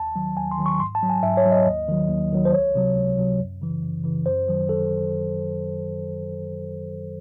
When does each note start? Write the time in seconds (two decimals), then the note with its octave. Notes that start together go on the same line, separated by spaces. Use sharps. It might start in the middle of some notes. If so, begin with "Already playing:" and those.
Already playing: D#2 A5
0.16 D#3 F#3
0.37 D#2 G#5
0.51 C6
0.58 D#3 F#3
0.66 C#6
0.80 G#2 C6
0.95 A5
1.02 F#3
1.10 G#5
1.23 G#2 E5
1.37 C#5
1.46 F#3
1.52 D#5
1.67 D#2
1.89 D#3 F#3
2.09 D#2
2.32 D#3 F#3
2.45 C5
2.52 C#2 C#5
2.75 C3 F#3
2.96 C#2
3.18 C3 F#3
3.40 F#2
3.62 C#3 E3
3.83 F#2
4.04 C#3 E3
4.26 F#2 C5
4.48 D#3 F#3
4.69 A4